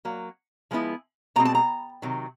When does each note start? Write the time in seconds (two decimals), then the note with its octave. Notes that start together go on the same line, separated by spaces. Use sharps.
0.05 F#3 A#3
0.71 F3 G#3 B3 E4
1.36 B2 G#3 C4 A#5
1.45 A5
1.55 A#5
2.02 C3 D#3 F#3